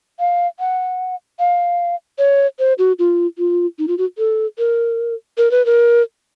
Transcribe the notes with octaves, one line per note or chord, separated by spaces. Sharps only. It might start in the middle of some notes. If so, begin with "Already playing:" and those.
F5
F#5
F5
C#5
C5
F#4
F4
F4
D#4
F4
F#4
A4
A#4
A#4
B4
A#4